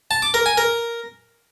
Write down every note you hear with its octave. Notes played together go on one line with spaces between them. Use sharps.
A5
D6
A#4
G#5
A#4